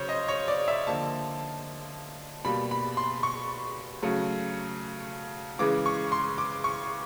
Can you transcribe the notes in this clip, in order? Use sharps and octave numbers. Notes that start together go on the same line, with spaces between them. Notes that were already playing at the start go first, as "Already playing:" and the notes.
Already playing: C#3 F#3 C5 C#5
D#5
C#5
D5
E5
D3 F3 A#3 A5
B2 G3 A#3 B5
B5
C6
C#6
C#3 F#3 A3
C#3 E3 G#3 D6
C#6
C6
D6
C#6